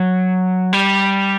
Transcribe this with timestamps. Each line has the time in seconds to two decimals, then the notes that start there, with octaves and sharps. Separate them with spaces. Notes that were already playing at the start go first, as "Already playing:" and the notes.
Already playing: F#3
0.73 G3